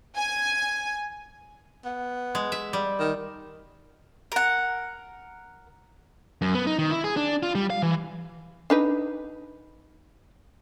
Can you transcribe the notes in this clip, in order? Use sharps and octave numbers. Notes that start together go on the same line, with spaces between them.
G#5
B3
G#3
E5
G3
D#3
A#4 F#5
F#2
B3
D#4
D#3
E4
G#4
D4
F4
G3
F5
E3
D4 D#4 B4